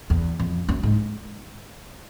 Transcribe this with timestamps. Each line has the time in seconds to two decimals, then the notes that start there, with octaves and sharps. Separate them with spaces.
0.10 E2
0.39 F2
0.69 F#2
0.83 G#2